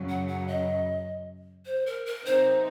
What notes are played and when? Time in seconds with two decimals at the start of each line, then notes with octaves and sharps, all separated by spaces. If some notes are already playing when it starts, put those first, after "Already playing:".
Already playing: F#2 C#3 F#3
0.09 F#5
0.28 F#5
0.48 D#5
1.66 C5
1.86 A#4
2.06 A#4
2.25 C3 F#3 C4 D#4 C5